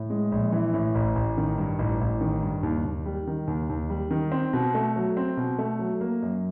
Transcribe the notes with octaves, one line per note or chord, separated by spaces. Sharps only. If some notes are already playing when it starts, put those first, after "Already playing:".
Already playing: A2
G#3
A#1
E3
A2
A1
A1
D#3
G2
A1
A1
D#3
G2
D#2
D#2
G3
D#3
D#2
D#2
G3
D#3
C4
B2
A3
F#3
C4
B2
A3
F#3
A#3
F#2